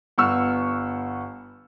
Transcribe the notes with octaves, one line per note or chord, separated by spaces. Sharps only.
G1 B3 C#6 E6 F6